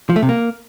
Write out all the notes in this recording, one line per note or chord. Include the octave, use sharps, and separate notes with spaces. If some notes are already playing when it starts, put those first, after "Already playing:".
F3
A3
C3
A#3